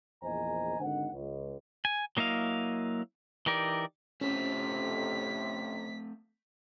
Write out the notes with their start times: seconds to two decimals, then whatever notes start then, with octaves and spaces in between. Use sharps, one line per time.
0.23 A#1 E2 C5 D#5 G#5 A#5
0.79 G#1 D3 D#4 F#5
1.13 C#2
1.85 G#5
2.17 F#3 A#3 E4 D#5 F5
3.46 E3 D#4 G4 A#4 D5
4.21 F2 A2 C3 A3 C4 C#4 B6